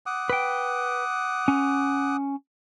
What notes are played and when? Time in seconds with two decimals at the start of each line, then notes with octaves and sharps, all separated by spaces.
0.06 F#5 D6 D#6
0.30 B4 G5
1.48 C#4